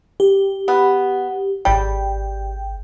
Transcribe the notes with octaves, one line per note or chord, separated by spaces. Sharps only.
G4
B3
G#1 G3 G5